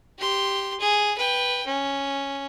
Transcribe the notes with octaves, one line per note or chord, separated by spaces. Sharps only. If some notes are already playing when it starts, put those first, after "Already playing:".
G4 C6
G#4
B4 G5
C#4